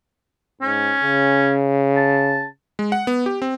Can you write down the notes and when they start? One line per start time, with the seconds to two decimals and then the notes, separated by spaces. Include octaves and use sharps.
0.61 G#2 C#4
1.03 C#3
1.97 A5
2.79 G#3
2.92 F#5
3.07 B3
3.26 G4
3.42 C4